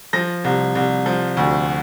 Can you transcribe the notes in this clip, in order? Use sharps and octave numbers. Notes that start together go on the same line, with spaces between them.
F3 A#6
C2
C2
F3
D2